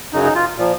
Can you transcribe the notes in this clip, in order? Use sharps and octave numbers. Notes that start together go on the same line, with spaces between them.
F#2 C#3 F#3 D#4
D#4
F4
A#2 F3